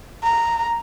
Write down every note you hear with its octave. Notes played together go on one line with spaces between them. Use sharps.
A#5